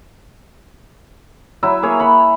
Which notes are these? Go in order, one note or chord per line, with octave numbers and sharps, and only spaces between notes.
F#3 E4 E5
A#3 G#4 C#5
F#5 B5